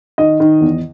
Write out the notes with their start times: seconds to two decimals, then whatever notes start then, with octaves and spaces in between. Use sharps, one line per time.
0.18 D#3 D#5
0.40 D#3
0.61 E2